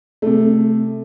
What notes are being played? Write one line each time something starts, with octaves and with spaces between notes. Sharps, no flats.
C3 A3